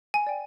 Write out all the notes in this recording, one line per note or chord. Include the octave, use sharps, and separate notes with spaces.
G#5
D5 G5